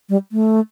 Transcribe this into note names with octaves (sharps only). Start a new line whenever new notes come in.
G3
A3